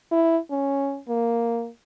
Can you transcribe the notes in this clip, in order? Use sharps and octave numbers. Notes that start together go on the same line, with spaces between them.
E4
C#4
A#3